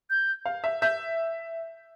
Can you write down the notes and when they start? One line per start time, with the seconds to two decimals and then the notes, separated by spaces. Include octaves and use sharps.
0.10 G6
0.46 F5
0.64 E5
0.82 E5 G6